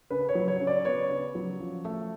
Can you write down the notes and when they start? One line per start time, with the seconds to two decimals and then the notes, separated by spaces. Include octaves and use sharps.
0.10 C#3 B4
0.29 C#5
0.35 F#3
0.48 C#5
0.61 C#3
0.67 D5
0.85 B3 C#5
1.10 C#3
1.35 F#3
1.60 F3
1.85 A3